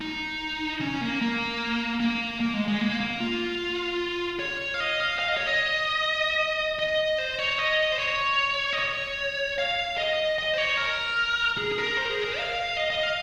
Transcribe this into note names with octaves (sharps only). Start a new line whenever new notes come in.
D#4
C#4
A#3
A#3
A#3
A#3
G#3
G#3
A#3
A#3
F4
C#5
F5
D#5
F5
F5
D#5
C#5
D#5
D#5
C5
C#5
D#5
C5
C#5
D#5
C#5
F5
D#5
D#5
C5
C#5
A#4
G#4
G#4
A#4
C5
A#4
G#4
A#4
F5
D#5
D#5
F5